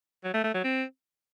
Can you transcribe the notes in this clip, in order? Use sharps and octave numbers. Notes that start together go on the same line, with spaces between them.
F#3
A3
A3
F#3
C4